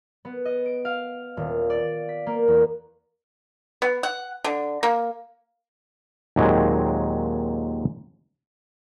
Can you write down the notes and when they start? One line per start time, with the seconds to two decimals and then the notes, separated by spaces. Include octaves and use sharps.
0.25 B3
0.45 D#5
0.66 D7
0.85 F5
1.37 D#1
1.70 D5
2.09 B6
2.27 A#3
2.48 E2
3.82 B3
4.03 F#5
4.44 D3
4.83 A#3
6.36 D#2 A#2 F#3 G#3 C4